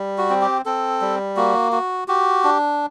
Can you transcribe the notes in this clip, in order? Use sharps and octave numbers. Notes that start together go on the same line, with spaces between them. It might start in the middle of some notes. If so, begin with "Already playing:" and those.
Already playing: G3
F#4
C4
G4
C4 A4
G3
A#3 F#4
F#4
F#4 G4
D4